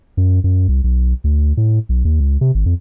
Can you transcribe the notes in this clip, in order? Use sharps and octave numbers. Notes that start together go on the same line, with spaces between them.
F#2
F#2
C2
B1
D2
A2
B1
D#2
C#2
C3
G#1
F2